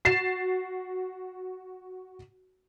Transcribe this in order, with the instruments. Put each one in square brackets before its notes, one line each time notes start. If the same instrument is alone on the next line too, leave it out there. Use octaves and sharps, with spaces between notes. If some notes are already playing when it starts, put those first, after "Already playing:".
[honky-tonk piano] F#4 A6 C7 E7